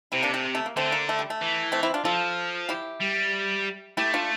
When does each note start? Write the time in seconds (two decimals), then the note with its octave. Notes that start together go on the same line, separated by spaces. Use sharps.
0.12 C3 C4 E4
0.23 A#3 D4
0.34 A3 C4
0.55 A3
0.66 A#3
0.76 D3 A3 C4
0.92 A#3
1.09 A3
1.19 G3
1.30 A3
1.41 E3
1.72 A3 C4
1.83 C4 E4
1.94 D4 F4
2.05 F3 F4 A4
2.69 E4 G4
3.01 G3
3.97 A3 E4 G4
4.14 D4 F4